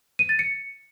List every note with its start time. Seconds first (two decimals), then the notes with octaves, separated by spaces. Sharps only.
0.19 D#7
0.29 A6
0.39 C#7